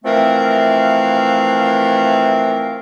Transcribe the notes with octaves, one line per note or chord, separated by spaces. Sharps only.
E3 F3 A3 C4 A#4 F5